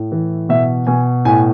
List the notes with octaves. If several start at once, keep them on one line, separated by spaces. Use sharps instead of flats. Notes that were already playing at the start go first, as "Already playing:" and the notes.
Already playing: A2
E3
B2 E5
B2 G#5
A2 G#5